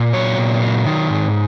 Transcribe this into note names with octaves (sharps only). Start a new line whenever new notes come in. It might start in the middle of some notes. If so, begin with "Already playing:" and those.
Already playing: A#2
F#3 C#5
A#2
F#3
D#3
G#2